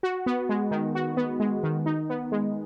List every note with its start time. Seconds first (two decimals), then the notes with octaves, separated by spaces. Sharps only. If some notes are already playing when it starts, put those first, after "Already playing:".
0.03 F#4
0.26 B3
0.49 G#3
0.71 D#3
0.95 F#4
1.17 B3
1.40 G#3
1.63 D#3
1.86 D#4
2.10 B3
2.32 G#3